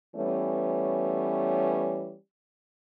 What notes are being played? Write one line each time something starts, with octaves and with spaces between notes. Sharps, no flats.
E3 G3 A3 B3 C#4 C#5